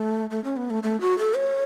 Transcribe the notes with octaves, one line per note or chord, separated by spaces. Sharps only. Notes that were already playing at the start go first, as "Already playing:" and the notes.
Already playing: A3
A3
C#4
B3
A3
A3
F#4
A4
C#5